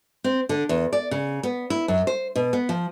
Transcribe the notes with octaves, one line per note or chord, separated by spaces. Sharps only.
C4
D3
E2
D5
C#3
B3
E4
F#2
C5
B2
B3
F3